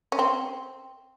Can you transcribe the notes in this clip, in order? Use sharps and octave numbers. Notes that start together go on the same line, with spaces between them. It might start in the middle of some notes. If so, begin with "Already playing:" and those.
C#4
C4